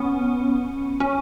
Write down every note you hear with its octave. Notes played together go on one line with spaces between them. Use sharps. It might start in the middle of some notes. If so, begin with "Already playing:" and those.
Already playing: B3 C#4
C#4